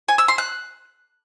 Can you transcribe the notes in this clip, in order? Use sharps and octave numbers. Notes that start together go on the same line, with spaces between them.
G#5
E6
C6
F#6